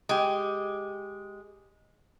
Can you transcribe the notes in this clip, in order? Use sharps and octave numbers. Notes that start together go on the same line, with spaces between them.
G#3 G4